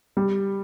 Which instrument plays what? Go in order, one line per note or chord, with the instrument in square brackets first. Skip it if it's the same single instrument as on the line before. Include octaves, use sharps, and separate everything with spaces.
[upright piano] G3